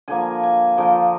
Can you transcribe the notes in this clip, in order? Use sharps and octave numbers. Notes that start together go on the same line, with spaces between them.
D3 F3 A#3 G#5
G#5
D3 F3 A#3 G5